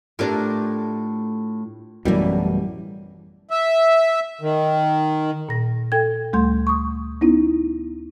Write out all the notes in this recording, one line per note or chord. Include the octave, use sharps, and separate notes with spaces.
A2 A3 D4 F4 G4 A#4
A1 F#2 B2 E3 G3 A#3 D4
E5
D#3
A#2 A#6
A4 G5 G#6
D2 G3 A3 C6 G6
C#6 D#6
B3 C#4 D#4 E4